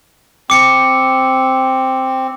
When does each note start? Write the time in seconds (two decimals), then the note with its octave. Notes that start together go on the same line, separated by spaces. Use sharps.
0.50 C4 D6 C#7